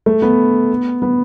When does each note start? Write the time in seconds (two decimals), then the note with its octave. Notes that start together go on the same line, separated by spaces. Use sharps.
0.06 A3
0.22 B3
1.02 B3